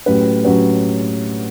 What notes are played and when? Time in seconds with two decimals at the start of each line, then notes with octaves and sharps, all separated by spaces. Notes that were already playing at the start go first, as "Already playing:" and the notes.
0.06 A2 F#3 C#4 G4 B4
0.45 A2 F#3 C#4 G4 B4